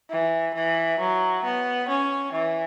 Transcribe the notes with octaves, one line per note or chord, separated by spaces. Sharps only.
E3
E3
F#3
B3
C#4
E3